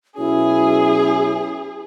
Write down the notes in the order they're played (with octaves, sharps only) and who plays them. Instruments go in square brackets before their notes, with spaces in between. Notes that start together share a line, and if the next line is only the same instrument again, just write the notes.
[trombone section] B2 F#3 C#4 [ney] E4 [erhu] G#4